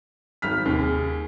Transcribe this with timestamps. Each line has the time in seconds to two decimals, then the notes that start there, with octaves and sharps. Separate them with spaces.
0.42 G#1 F6 B6
0.65 D#2 C3
0.79 G#4